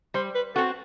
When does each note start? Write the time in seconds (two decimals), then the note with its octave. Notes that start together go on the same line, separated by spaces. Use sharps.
0.14 G3 C5
0.35 B4
0.55 C4 F#4 A4